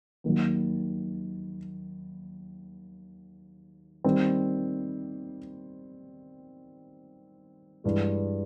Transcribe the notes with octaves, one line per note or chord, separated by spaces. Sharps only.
D#2 D#3 F#3
D#3 G3 C4
G2 E3 G#3